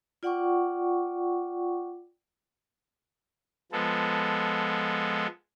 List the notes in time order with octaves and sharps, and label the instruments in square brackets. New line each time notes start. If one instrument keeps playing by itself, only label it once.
[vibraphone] F4 D5 F#5 G5 C#6 D6
[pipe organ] F3 G#3 B3 A4